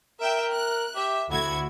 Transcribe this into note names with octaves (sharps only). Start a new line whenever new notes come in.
A#4 E5 G5
F#6
G4 E5
D2 E4 F#4 G#6